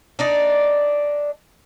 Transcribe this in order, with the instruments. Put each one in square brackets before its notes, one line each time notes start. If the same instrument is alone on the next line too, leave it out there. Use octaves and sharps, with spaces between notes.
[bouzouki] D4 D#4 D5